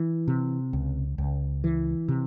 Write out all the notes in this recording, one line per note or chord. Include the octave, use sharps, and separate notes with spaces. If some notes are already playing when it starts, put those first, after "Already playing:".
Already playing: E3
C3
C#2
C#2
E3
C3